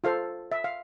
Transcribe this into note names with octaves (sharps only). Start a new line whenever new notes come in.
F4 A4 C5 F5
E5
F5